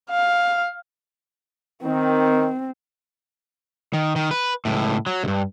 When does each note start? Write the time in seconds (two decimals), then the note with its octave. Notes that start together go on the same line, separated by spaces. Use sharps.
0.10 F5
1.83 D#3 C4
3.93 D#3
4.16 D#3
4.31 B4
4.65 C#2 A2
5.06 F#3
5.24 C#2 G2